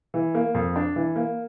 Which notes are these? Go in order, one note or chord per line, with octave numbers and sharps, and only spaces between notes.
E3
A#3
F2
D4
E3
A#3